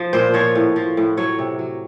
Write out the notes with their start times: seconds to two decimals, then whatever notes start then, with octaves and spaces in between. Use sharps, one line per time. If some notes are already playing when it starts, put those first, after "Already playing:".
Already playing: F3
0.13 A#2 C5
0.34 F3 C#5
0.55 A2
0.76 F3
0.97 A2
1.17 F#3 C#5
1.39 C3
1.59 F#3